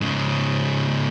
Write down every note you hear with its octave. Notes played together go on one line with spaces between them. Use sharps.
G#2 C#3